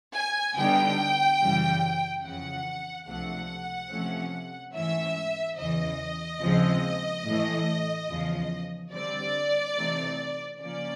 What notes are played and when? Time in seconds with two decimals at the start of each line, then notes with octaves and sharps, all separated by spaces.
0.16 G#5
0.57 D3 G3 B3 D#4 G5
1.41 F#2 C#3 E3 G3
2.24 F2 C#3 E3 F#5
3.08 C#2 C3 F3 A3 D4 F#5
3.91 C3 F3 A3 C#4
4.75 G#2 E3 A3 C#4 E5
5.58 E2 C#3 E3 D#5
6.42 D#2 C#3 F3 G#3 C4
7.26 A2 E3 A3
8.09 E2 C#3 F3
8.93 D3 G3 C4 D5
9.76 C3 E3 A3 C4 D#4
10.60 C#3 F3 A#3 C#4 D5